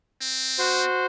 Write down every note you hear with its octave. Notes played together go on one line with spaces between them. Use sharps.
C4
F#4 C5